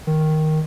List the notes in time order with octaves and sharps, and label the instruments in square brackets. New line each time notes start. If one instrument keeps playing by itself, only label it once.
[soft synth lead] D#3